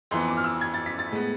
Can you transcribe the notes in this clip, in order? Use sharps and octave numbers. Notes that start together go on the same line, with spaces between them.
F2 E3 B3 C6
D6
F6
E6
G#6
A6
B6
A6
A2 G#3 B3